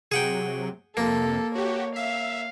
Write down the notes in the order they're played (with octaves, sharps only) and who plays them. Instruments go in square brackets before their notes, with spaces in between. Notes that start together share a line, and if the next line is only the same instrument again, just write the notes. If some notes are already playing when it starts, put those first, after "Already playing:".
[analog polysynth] C3 F#3 [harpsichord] G#4 F#5 G5
[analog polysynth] F2 C3 [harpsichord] A#3 [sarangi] A4
[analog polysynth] F#4 G4 [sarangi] C#5
[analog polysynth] E5 [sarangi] F5